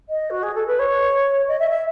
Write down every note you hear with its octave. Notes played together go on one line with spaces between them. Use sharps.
D#5
F#4
G#4
A4
B4
C#5
D#5
E5
E5